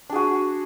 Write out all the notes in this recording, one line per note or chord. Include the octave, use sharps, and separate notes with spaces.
D4 F#4 G#4